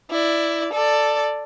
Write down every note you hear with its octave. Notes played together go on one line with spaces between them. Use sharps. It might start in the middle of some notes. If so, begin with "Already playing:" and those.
E4 D5
A4 D5